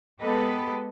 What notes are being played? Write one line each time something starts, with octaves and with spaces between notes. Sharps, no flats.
G#3 B3 G4 A4 B4 D#5